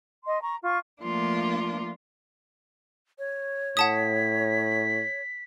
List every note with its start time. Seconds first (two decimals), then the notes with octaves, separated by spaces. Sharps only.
0.25 D#5 C6
0.41 A#5 C#6
0.62 F4 C#6
1.03 F3 A3 A#3 D4 F4
3.19 C#5
3.77 A2 F#5 A5 D#6 B6